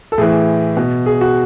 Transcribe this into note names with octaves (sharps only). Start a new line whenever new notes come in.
A4
A2 E3 G#4
B2
G#4
F#4